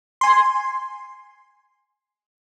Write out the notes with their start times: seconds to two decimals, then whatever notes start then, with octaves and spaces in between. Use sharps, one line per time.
0.21 G#5 C6